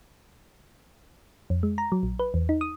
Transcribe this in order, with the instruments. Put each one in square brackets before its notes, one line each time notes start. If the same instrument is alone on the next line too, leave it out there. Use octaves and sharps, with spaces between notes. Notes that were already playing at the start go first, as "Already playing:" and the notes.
[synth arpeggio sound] F2
G#3
A#5
F#3
A#1
B4
E2
D#4
D#6